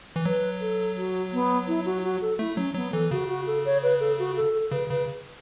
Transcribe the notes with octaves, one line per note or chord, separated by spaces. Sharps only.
E3
F#3 B4
A4
F#4
B3
E4
F#4
F#4
A4
A3 E4
F#3 C#4
F#3 B3
E3 A4
C#3 F#4
F#4
A4
C#5
B4
A4
F#4
A4
A4
C#3 B4
C#3 B4